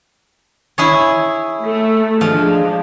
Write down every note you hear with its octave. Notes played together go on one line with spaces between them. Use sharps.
E4 G#4 C#5
A3
F3 G#3 D4